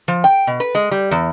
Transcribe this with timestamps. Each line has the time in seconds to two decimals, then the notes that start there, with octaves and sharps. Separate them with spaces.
0.08 F3
0.24 G5
0.47 B2
0.60 B4
0.75 G#3
0.91 G3
1.11 E2